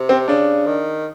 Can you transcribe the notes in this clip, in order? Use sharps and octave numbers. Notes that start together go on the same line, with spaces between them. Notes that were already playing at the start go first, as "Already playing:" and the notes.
Already playing: C3
C4
C#3 D4
D#3